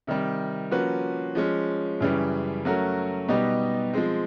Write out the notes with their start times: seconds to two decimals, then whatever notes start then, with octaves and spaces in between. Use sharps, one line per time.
0.07 C3 D#3 G3
0.71 F3 A#3 C#4 F#4 B4
1.35 F3 G#3 C#4
2.01 F#2 C#3 E3 G3
2.65 F#3 A3 C#4 F#4 A#4
3.28 B2 G3 B3 D#4 G4
3.93 F3 G#3 C4